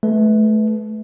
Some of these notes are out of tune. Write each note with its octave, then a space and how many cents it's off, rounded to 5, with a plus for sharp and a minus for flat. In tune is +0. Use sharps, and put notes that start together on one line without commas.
A3 -25 B4 +0